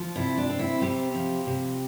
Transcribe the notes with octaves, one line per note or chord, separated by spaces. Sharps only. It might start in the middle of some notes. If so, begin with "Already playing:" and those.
Already playing: F3
C3 E4
D4
C4
E4
C3 G3 G4
F3
C3